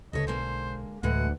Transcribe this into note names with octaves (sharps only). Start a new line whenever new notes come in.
D2 C#3 A4 C#5 D#5
B1 D3 G#3 A#3 C5
D2 A2 D3 E3 G#3 F#5